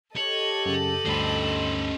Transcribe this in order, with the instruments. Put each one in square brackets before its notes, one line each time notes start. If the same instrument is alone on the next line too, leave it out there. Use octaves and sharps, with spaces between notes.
[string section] G4 A4 D#5 [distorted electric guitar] C#5 [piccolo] F#7
[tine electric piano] F#2 C#3 [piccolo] F#7
[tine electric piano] D2 G2 B5 [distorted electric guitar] C#4 C5